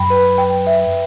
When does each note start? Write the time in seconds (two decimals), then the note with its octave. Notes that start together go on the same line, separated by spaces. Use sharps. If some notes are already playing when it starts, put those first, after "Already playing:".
Already playing: F#2 G5 B5
0.10 B4
0.38 G5
0.67 E5